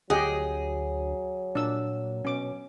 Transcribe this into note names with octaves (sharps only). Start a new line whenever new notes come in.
D2 F#3 G4 G#4 D#5 F#5
A#2 D4 E6
B2 C#4 D6